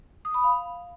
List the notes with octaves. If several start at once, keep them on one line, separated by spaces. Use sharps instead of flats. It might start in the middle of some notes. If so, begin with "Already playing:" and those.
D#6
B5
F5